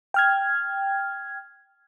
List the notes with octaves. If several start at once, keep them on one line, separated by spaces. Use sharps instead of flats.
G5 F6 G#6